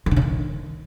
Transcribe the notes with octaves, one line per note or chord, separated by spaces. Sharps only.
E3
D3
C#3
D#3